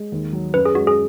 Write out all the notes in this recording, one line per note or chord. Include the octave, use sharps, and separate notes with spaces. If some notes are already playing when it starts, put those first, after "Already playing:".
Already playing: G#3
D#2
F#3
F#2 B4
G#4
G#3 F#4
G#4